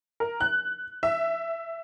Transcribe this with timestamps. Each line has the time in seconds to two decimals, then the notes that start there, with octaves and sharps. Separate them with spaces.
0.20 A#4
0.41 F#6
1.03 E5